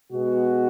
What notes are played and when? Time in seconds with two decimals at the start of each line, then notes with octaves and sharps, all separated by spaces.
0.11 B2 G#3 B3 F#4